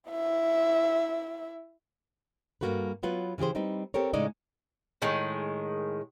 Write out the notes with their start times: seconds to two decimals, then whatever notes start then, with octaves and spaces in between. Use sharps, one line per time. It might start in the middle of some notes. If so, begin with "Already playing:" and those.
0.11 E4 E5
2.61 G2 A#2 A#3 F#4 A4 B4
3.03 F#3 B3 F4 B4
3.38 C#3 E3 G4 G#4 C5
3.55 G3 C4 D#4 B4
3.94 C4 G4 A4 A#4 C#5
4.13 A2 C#3 G#3 D#4 D5 D#5
5.02 A2 D#3 G#3